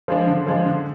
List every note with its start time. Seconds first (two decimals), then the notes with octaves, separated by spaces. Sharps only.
0.08 F3 G#3 D4
0.27 D3
0.47 F3 G#3 D4
0.66 D3